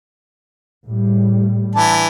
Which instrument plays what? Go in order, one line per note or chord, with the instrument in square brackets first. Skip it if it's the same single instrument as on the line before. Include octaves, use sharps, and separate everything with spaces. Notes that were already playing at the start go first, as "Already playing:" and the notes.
[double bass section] A2 G3
[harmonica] E3 D4 A5